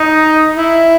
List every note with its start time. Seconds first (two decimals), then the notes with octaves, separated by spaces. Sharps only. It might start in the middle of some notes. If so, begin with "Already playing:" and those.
Already playing: D#4
0.56 E4